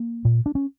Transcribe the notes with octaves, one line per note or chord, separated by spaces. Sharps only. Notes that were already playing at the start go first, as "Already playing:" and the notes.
Already playing: A#3
A#2
D4
C#4